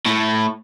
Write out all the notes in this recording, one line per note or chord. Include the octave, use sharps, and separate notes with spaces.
A2